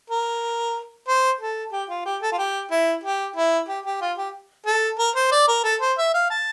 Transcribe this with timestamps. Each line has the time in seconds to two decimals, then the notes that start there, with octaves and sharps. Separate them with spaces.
0.10 A#4
1.08 C5
1.41 A4
1.72 G4
1.90 F4
2.05 G4
2.22 A4
2.32 F4
2.38 G4
2.71 E4
3.03 G4
3.36 E4
3.68 G4
3.85 G4
4.01 F4
4.18 G4
4.66 A4
4.99 A#4
5.16 C5
5.31 D5
5.48 A#4
5.64 A4
5.81 C5
5.98 E5
6.14 F5
6.30 A5